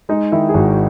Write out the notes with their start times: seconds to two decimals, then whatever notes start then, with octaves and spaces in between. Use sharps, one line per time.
0.09 G#3 D#4
0.32 D#3 E4
0.49 G#4
0.54 G#1 F#4